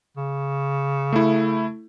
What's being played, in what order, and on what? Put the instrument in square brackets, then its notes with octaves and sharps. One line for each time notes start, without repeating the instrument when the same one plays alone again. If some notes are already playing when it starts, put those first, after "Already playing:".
[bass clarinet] C#3
[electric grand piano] A3 E4